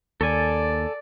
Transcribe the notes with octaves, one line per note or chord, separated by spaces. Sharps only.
D#2 A4 D5 G#5